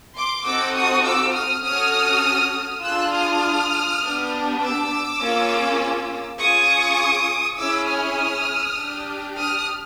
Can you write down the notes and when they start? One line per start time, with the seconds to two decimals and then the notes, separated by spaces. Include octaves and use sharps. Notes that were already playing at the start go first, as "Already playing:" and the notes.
0.17 C6 D6
0.46 C4 D#4 F#4 A4 D6 E6
0.75 C#6 D#6
1.05 D6 E6
1.34 D#6 F6
1.64 C#4 F#4 A4 D#6 F6
2.84 D4 F4 G#4 E6 F#6
3.12 D#6 F6
4.02 B3 D4 G4
4.61 D6 E6
5.20 A#3 C#4 F4 G#4
6.40 C#4 F4 G#4 C#6 D#6
7.58 C#4 E4 G#4 D6 E6
7.87 D#6 F6
8.77 D4 G4
9.36 D#6 F6